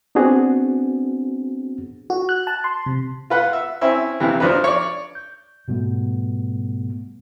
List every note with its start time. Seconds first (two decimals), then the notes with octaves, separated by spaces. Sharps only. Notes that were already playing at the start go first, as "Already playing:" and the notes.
0.15 B3 C4 D4 F#4 G#4
2.10 F#4
2.29 F#6
2.47 A5
2.64 C6
2.86 C3
3.30 F4 B4 F#5
3.53 E5
3.81 C4 C#4 E4 E5
4.20 B1 C3 E3
4.40 F3 D4 D#4 B4
4.64 C#5 D5
5.15 G6
5.68 G#2 B2 G3 A3 B3